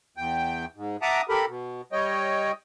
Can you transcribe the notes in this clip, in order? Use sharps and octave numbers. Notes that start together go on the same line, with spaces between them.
E2 G5
G#2
E5 F#5 A5 A#5 D6 D#6
G4 A4 A#4 B5
B2
G3 C#5 D#5 G5